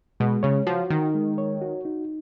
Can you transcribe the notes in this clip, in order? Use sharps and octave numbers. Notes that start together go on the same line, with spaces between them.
B2 G#3
C#3 C#5
F3 F#4
D#3 D#4
G#3
C#5
F#4
D#4